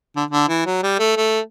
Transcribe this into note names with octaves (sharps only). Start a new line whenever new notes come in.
D3
D3
E3
F#3
G3
A3
A3